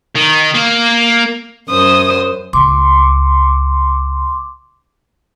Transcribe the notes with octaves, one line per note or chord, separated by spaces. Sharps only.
D#3
A#3
F#2 C5 D#6
C#2 C6 D6